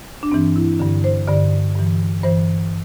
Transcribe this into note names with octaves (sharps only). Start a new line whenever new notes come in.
D4
G2 E3 C4
E4
G2 D3
C5
G2 D3 D5
G2 E3
G2 E3 C5